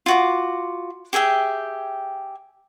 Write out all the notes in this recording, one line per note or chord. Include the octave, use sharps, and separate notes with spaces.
F4 F#4 D6
G4 G#4 E5 G5